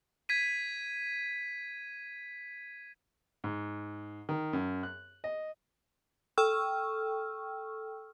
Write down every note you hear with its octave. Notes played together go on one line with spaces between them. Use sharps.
G#6 B6 D#7
G#2
D#3
F#2
F#6
D#5
A4 G5 C#6 E6 F6